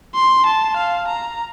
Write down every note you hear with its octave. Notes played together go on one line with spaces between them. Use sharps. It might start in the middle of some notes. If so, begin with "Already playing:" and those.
C6
A5
F5
A#5